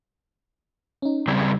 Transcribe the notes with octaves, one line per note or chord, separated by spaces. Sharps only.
C#4 D#4
C#3 G3 C4 E6 G#6